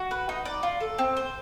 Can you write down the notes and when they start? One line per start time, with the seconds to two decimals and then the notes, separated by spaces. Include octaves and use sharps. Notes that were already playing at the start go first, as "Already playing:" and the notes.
Already playing: F#4
0.11 B4
0.29 D#4
0.45 D5
0.63 F4
0.80 A4
0.99 C4
1.17 C5